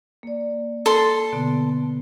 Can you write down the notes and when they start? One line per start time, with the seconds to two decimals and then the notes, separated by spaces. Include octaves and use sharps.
0.23 A#3 D5
0.86 A4 C6
1.32 B2 D3 B3